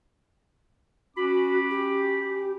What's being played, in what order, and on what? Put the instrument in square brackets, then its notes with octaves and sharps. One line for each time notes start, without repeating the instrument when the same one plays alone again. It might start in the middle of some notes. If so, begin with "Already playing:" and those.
[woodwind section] C#4 B5 D6 [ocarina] F#4
[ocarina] G4